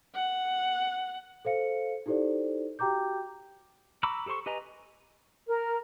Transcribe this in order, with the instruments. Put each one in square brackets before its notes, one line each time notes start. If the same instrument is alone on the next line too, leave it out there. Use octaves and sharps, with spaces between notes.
[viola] F#5
[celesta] A4 C5 F5 C#7
D#4 E4 G4 A4 C5 D5
F#4 G4 G5 A#5 D6 G6
[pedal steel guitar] A#5 B5 C#6 D6 E6
G4 A4 C5 C6 C#6
G4 B4 D#5 G#5 A#5
[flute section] A#4